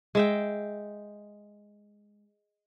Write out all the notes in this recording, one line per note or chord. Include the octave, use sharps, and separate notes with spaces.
G#3 E5 G5